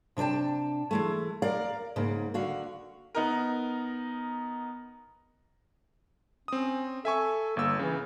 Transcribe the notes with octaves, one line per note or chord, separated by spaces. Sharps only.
C3 D4 B4 G5 A5
E3 G#3 A3
A#4 D5 F5
G#2 C#3 A#3
D3 F#4 F5
B3 D#4 A#4
C4 C#4 D#6
A4 E5 G#5 C#6
G1 A#3 E6
C#3 E3